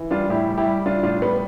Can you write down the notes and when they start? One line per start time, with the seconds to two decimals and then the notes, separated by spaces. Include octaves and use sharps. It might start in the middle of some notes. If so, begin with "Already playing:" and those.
Already playing: E3
0.11 G3 D4 F4
0.29 A2 E4 G4
0.48 G3
0.57 E4 G4
0.66 G3
0.85 G3 D4 F4
1.03 A2 D4 F4
1.22 G3 B3